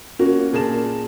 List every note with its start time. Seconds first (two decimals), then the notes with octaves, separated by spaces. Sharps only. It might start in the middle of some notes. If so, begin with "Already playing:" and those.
0.19 A#3 C#4 F#4 A#4
0.53 A#2 G#4 A#4 A5 E7